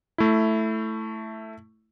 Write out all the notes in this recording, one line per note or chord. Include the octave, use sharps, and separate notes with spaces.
A3 E4